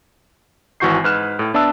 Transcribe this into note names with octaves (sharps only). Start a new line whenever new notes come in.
G#1 E3 F#4 C#6 G6 C7
G#2 B4 F6 F#6 E7
A2
B3 D4 E5 A5 E6